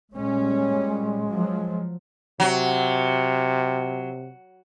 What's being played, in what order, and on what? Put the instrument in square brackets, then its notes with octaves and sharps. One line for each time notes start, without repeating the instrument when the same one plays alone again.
[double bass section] A#2 G3 C#4 [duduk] G#3
[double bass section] F3 F#3
[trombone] C3 [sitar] F#3